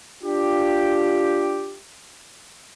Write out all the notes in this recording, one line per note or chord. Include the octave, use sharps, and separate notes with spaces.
D4 F4 G4